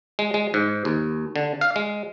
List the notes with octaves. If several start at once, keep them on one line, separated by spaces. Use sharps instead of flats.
G#3
G#3
G#2
D#2
D3
F5
G#3